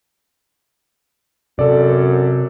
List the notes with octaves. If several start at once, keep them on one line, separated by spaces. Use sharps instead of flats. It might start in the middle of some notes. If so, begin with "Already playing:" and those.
F#2 C3 A4 D5